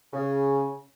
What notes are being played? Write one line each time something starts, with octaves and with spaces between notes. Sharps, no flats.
C#3